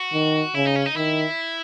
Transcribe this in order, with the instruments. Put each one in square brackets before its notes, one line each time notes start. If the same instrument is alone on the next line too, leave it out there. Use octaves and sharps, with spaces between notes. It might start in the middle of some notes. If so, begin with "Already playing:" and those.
Already playing: [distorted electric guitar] F#4
[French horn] D#3
[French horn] C#3 [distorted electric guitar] E4
[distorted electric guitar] D#4
C#4
D#4
[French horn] D#3 [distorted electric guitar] E4